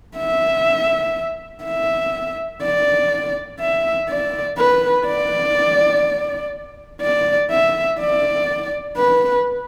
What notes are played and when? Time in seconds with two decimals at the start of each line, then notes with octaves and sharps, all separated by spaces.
0.17 E5
1.64 E5
2.62 D5
3.60 E5
4.09 D5
4.58 B4
5.06 D5
7.02 D5
7.51 E5
8.00 D5
8.97 B4